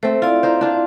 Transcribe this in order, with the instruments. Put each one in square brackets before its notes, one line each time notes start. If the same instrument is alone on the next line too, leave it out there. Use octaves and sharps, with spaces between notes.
[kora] A3 C4 [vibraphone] C5
[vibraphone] E4 D5 [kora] F4
[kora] D#4 C5
D4 F4 C5